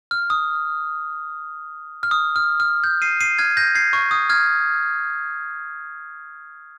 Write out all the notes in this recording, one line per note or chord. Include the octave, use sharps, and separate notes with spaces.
F6
D#6
F6
D#6
F6
F6
G6
C7 D#7
C7 D#7
F6 G#6
G6 A#6
G#6 C7
C#6
D#6
F6 G#6